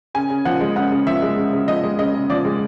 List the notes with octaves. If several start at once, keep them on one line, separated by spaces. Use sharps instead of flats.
C#3 G#5
C#3
F3 F#5
G#3
C#3 F#5
C#3
F3 E5
G#3
C#3
C#3
F3 D#5
G#3
C#3 D#5
C#3
F3 D5
G#3